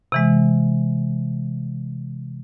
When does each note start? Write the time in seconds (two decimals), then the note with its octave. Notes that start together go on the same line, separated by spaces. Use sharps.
0.12 C3 E3 G#3